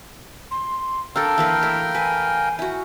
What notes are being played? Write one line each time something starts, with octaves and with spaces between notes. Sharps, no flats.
C6
D4 A4 A#4 F5 G5 E6
E3 A#3 B4
A3 E4
B4 G#5
E4 F#4